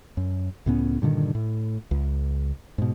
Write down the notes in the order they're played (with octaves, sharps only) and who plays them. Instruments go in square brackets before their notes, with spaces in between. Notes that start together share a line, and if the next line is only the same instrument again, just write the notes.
[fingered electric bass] F#2
C#2 A2 B3 C#4
G2 A#2 D3 D#3
A2
C#2
G#2 B2